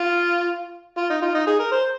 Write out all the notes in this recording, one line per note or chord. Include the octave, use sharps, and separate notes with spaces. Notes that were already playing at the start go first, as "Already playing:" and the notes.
Already playing: F4
F4
D#4
F4
D#4
G#4
A#4
C5